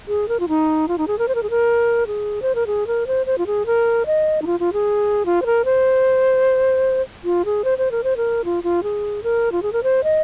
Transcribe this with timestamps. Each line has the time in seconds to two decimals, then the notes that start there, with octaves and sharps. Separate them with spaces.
0.08 G#4
0.29 A#4
0.40 F4
0.49 D#4
0.88 F4
0.98 D#4
1.07 G#4
1.19 A#4
1.28 C5
1.35 A#4
1.43 G#4
1.50 A#4
2.07 G#4
2.42 C5
2.55 A#4
2.67 G#4
2.87 A#4
3.07 C5
3.26 C5
3.38 F4
3.47 G#4
3.66 A#4
4.06 D#5
4.42 D#4
4.47 F4
4.60 F4
4.73 G#4
5.26 F4
5.42 C5
5.46 A#4
5.65 C5
7.24 F4
7.45 G#4
7.65 C5
7.78 C5
7.91 A#4
8.04 C5
8.17 A#4
8.45 F4
8.64 F4
8.83 G#4
9.23 A#4
9.52 F4
9.63 G#4
9.73 A#4
9.83 C5
10.04 D#5